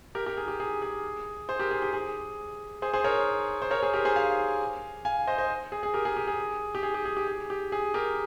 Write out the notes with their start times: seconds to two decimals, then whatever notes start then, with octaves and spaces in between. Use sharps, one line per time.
0.15 G4 A#4
0.26 G4 A#4
0.37 G#4
0.48 G4
0.60 G#4
0.82 G#4
1.49 G#4 C5
1.60 G4 A#4
1.71 G#4
1.82 G4
1.93 G#4
2.82 G#4 C5
2.93 G#4 C5
3.04 A#4 C#5
3.62 C5
3.71 A#4 C#5
3.83 G#4 C5
3.94 G4 A#4
4.05 G#4 C5
4.16 F5 G#5
5.05 F5 G#5
5.27 C5 D#5
5.38 C5 D#5
5.72 G#4
5.83 G#4
5.94 G4 A#4
6.05 G#4
6.17 G4
6.27 G#4
6.75 G4
6.83 G#4
6.94 G4
7.05 G#4
7.17 G4
7.28 G#4
7.50 G4
7.72 G#4
7.94 G4 A#4